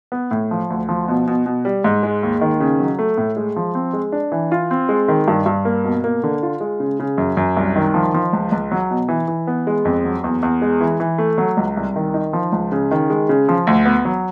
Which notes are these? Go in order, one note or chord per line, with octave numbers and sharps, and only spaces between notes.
B3
A2
F3
D2
F3
B2
B2
B2
G3
G#2
G#3
D#2
D#3
C#3
F#3
A3
A2
G#3
F3
C4
G#3
D4
E3
F4
C4
G#3
D#3
G2
G2
A#3
B2
A#3
D3
F4
G#3
C#3
C#3
F#2
F#2
C2
D#3
F3
F3
C#2
C#2
F#3
B2
E3
E3
B3
G#3
F2
F#3
E2
E2
G#3
E3
E3
A3
F#3
C#2
C2
D#3
D#4
F3
C#2
C#3
D#3
G#3
C#3
F3
D2
B3
F#3